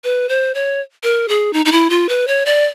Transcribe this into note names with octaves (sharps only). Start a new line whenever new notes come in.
B4
C5
C#5
A#4
G#4
D#4
D#4
E4
F4
B4
C#5
D5